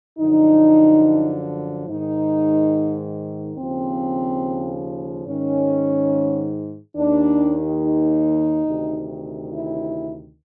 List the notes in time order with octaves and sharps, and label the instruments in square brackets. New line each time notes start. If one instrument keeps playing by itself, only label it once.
[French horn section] F#2 D3 F3 D#4
G#2 D#3 D#4
D#2 C#3 F3 C4
G#2 D#3 C#4
D#2 D#3 D4
D#4
D2 C3 D#3
E4